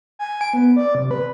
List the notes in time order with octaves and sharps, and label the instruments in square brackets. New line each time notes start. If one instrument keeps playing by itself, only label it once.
[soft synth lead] G#5
D7
B3
D5
C3
B4